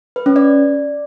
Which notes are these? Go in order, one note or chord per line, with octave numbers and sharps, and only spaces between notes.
B4
C#4
D5